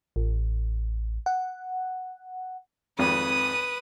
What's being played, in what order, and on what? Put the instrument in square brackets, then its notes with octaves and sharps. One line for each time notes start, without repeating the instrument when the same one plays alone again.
[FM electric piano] A1
F#5
[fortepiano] G#1 F2 [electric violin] B4 [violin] D#6 D#7